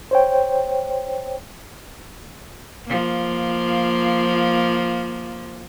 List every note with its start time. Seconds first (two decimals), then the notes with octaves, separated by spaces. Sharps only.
0.11 C5 C#5 G5
2.86 F3 A#3